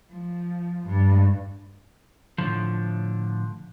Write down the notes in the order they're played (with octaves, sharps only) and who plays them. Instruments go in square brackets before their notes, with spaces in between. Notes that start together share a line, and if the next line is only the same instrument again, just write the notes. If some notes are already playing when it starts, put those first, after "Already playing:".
[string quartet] F3
G2
[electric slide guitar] A2 D3 F3